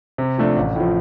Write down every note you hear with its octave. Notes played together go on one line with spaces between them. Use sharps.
C3
F3 A3 D4
A1
A2 F3